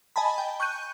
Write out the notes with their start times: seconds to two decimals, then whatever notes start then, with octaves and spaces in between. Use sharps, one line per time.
0.16 D#5 G#5 A5 B5
0.38 G5
0.60 C#6 F#6 G6 D#7